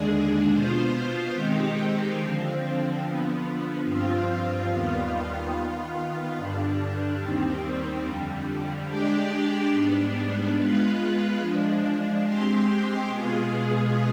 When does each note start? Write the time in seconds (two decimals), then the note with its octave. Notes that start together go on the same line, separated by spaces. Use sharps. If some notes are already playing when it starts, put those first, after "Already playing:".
Already playing: D#2 D3 G#3 D4 G#4
0.49 B2 B3 F4 C5
1.33 D#3 G#3 C4 D#4 G4
2.16 D3 F3 C4
3.00 D3 F3 B3
3.84 G2 F3 C4 F4
4.68 D#2 D#3 G3 B3 F4
5.51 D#3 B3 F4
6.35 G2 D3 G3 D4
7.19 D#2 D#3 G3 C4
8.03 F2 D3 G3
8.87 G#3 D4 G4 D5
9.71 G#2 G3 B3 D4
10.55 G#3 B3 F4 B4
11.39 F3 G#3 D4
12.22 G#3 C4 G4 C5
13.06 B2 G#3 B3 F4 G#4